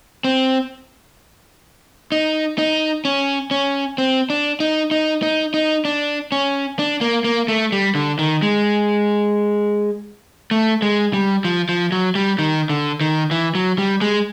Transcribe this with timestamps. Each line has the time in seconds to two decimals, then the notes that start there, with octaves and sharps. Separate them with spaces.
0.24 C4
2.12 D#4
2.58 D#4
3.05 C#4
3.51 C#4
3.98 C4
4.30 D4
4.60 D#4
4.91 D#4
5.23 D#4
5.54 D#4
5.85 D4
6.32 C#4
6.79 D4
7.01 A#3
7.24 A#3
7.48 A3
7.72 G3
7.95 D3
8.19 D#3
8.42 G#3
10.51 A3
10.82 G#3
11.13 G3
11.45 F3
11.69 F3
11.92 F#3
12.15 G3
12.39 D#3
12.70 D3
13.01 D#3
13.31 E3
13.55 F#3
13.78 G3
14.01 G#3